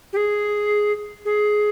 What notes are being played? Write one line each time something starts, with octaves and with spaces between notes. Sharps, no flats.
G4
G#4
G#4